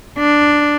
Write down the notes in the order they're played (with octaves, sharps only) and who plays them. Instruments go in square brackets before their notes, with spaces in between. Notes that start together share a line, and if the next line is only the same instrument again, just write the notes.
[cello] D4